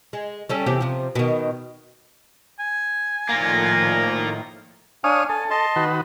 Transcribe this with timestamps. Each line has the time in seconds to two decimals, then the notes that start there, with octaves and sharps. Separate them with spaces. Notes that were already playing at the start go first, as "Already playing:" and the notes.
0.13 G#3
0.49 G3 C#4 A4
0.66 E2 C3 G4
0.81 C3 F3
1.15 B2 D#3
2.59 G#5
3.29 A2 D#3 F3 A#3 F4 A#6
5.04 D4 C#5 F5 G#5 D#6
5.29 A4 G#5
5.50 D#5 A5 C6
5.76 D#3 F#4 B4